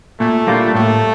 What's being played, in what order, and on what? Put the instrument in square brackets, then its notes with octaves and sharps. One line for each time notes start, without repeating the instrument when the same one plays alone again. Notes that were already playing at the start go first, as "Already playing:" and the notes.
[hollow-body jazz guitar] A#2 [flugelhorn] A3
[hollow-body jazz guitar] G3 A#3 D4 F4
[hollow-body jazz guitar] A2 [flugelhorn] A3